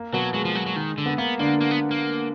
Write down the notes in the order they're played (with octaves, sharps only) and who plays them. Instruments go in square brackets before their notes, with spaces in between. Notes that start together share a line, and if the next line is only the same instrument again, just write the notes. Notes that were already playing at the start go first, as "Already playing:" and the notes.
Already playing: [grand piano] A#3
[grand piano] B2 B3 [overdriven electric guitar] F#3
[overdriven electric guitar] F#3 [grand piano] G#3
[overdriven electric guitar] F3
F#3
F#3
D#3
D3
[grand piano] B3
[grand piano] A#3 [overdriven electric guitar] B3
[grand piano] D3 D4 [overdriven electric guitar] A#3
[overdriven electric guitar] A#3
B3
A#3